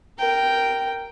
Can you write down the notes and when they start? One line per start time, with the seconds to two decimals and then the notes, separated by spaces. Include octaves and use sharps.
0.18 A#4 G5